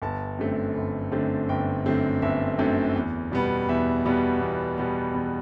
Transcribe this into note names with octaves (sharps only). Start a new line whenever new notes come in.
G1 A5
F#2 D3 A3 C4
G1
F#2 D3 A3 C4
G1 G5
F#2 D3 A3 C4
G1 E5
F#2 D3 A3 C4
E2
B2 G3 B3
E2 E5
B2 G3 B3
E2
B2 G3 B3
E2